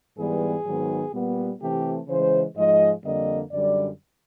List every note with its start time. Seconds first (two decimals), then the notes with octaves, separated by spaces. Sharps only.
0.17 G#2 E3 G3 B3 G#4
0.65 G#2 D#3 F#3 B3
1.13 A#2 G3 B3
1.61 C3 E3 A3 C4 G4
2.08 C#3 E3 G#3 C5
2.56 G#2 F3 G#3 D#5
3.04 F2 D3 G3 A#3 D#5
3.51 F#2 D3 G3 D5